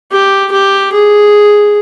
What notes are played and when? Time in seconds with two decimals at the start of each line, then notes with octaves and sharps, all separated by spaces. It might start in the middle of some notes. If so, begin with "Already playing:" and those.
0.12 G4
0.51 G4
0.93 G#4